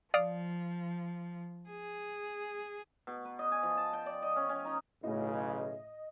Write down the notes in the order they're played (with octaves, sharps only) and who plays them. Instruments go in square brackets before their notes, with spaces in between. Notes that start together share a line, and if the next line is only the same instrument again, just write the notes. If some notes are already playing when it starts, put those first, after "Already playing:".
[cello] F3 [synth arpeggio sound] D5 F5 D#6
[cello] G#4
[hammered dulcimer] B2
B4
D#5
G#5
F3
A5
G5
D5
D#5
C#4
C#4
D#4
[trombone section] B1 C#3 [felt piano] A2 [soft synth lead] D#5